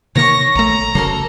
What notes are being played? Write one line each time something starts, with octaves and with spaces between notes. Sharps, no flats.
C3 D#3 A#3 C#5 C#6 A#6
A#1 A3 A#5
F1 C#3 F#3 A#3 A4 A#4